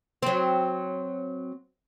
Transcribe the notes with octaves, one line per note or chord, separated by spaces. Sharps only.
F#3 C4